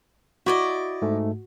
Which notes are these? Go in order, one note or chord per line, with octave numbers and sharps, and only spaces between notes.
E4 F#4 D5 D#5
G#2 A3